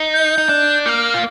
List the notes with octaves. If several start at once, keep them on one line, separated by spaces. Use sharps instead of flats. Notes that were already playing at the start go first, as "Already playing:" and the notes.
Already playing: D#4
G6
D#4
D4
A#3 F6 G6
F4